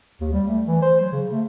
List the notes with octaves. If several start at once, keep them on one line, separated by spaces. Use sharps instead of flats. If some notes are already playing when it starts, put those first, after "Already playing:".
D#2
G3
A3
E3
C5
F#3
C#3
A3